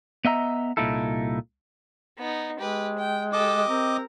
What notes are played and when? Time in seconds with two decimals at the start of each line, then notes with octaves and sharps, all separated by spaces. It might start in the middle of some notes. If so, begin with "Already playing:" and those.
0.25 B3 D#5 E5 A#5
0.77 C2 A#2 D#4 E4 A4
2.19 B3 D#4
2.59 G#3 G4 B4
2.98 G5
3.33 G4 A4 D#5 D6
3.68 C4 A#4